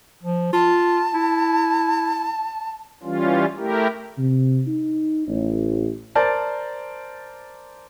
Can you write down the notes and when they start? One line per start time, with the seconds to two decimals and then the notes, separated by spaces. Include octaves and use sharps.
0.23 F3
0.53 F4 A5
1.14 E4
3.03 E3 G3 C#4 F4
3.57 A3 E4 G4 A#4
4.17 C3
4.67 D#4
5.28 A1
6.15 A#4 C5 D5 A5